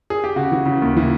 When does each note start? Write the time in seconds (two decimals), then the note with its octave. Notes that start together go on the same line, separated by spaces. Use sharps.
0.10 G#4
0.24 G4
0.36 C#3 F#4
0.52 E3
0.66 C#3
0.82 D#2
0.97 E3